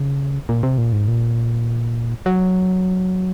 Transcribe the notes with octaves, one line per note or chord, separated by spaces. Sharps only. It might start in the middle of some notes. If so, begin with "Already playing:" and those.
Already playing: C#3
A#2
C3
A#2
G#2
A#2
F#3